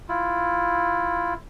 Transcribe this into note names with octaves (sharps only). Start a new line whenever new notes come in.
E4 F4